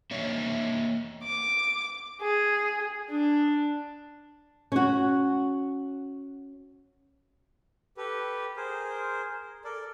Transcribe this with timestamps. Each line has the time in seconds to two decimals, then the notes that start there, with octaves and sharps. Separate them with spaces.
0.11 A#3 C#5 D#5 E5
1.23 D6
2.22 G#4
3.10 D4
4.72 C#4 F#4
7.97 G4 A4 B4
8.57 G#4 A#4 C5
9.64 A4 A#4 D5